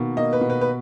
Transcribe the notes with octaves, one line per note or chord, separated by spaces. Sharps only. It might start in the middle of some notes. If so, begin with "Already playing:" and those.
Already playing: B2 D#3 A#3
A#3 D#5
B4
B2
B4
B4